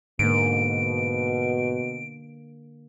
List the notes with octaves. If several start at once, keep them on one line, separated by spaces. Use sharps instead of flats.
G#2 B2 D3 A#3 D7